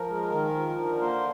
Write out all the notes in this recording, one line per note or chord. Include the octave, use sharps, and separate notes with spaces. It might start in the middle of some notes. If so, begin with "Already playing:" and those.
Already playing: F3 A#4
G#3
D#3
F3
D3
A#3 C5